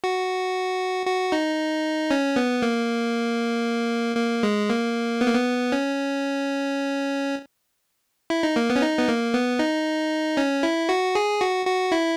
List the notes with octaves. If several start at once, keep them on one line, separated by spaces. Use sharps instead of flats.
F#4
F#4
D#4
C#4
B3
A#3
A#3
G#3
A#3
B3
A#3
B3
C#4
E4
D#4
A#3
B3
C#4
D#4
B3
A#3
B3
D#4
C#4
E4
F#4
G#4
F#4
F#4
E4